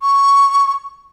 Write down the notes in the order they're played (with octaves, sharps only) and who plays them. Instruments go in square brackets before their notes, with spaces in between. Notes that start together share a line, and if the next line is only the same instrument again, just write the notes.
[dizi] C#6